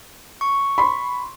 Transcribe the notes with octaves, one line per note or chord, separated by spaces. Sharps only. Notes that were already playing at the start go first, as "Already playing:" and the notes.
C#6
B5 C6